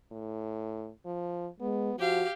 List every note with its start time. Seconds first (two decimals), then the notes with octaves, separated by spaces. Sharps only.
0.12 A2
1.06 F3
1.60 G#3 B3
1.99 F3 F#4 G4 F5